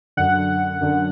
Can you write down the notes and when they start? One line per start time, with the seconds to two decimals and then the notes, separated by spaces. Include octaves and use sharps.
0.17 F#2 D3 F#5
0.81 F#2 D3